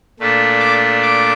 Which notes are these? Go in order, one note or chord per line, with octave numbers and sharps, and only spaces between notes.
A#2 A3 D4
D6
D6